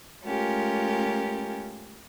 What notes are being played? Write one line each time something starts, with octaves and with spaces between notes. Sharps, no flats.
G#3 A3 C#4 F4 G4 A#4